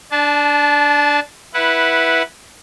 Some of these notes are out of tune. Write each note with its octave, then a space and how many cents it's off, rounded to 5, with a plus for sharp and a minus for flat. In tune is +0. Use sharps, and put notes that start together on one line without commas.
D4 -5 A5 -25
E4 +0 B4 -10 F#5 +0